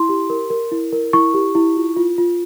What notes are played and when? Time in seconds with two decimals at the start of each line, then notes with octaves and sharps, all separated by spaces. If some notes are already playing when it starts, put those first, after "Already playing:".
Already playing: E4 C6
0.09 G4
0.30 A#4
0.50 A#4
0.72 E4
0.92 A#4
1.13 E4 C#6
1.34 G4
1.55 E4
1.76 F4
1.96 F4
2.18 F4